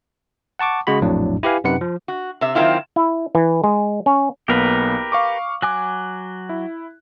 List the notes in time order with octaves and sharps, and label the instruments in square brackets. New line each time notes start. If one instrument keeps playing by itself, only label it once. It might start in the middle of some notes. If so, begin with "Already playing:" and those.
[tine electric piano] F#5 A5 C#6 D6
C#3 G#3 F#4 B5
A#1 F2 A2 F#3 D4
E4 G4 B4 F5 G#5
F#2 C3 D#4 B4 F#5 C#7
F3
[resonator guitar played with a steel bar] F#4
C3 E5
D#3 F#3 A3 C4 E4 F4
[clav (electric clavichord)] E4
E3
G#3
C#4
[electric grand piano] B1 A#3 B3 [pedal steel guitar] G4 A#4 B4
[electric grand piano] F5 C#6 D6
[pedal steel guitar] F#3 G#5 D6 [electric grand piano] F#6
[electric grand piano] E4